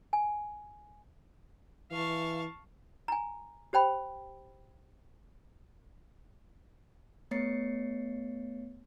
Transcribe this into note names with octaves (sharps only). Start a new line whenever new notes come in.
G#5
E3 F5 A5 C#6
G#5 A#5
G4 C5 G5 B5
A3 B3 C#5 A6 C7 C#7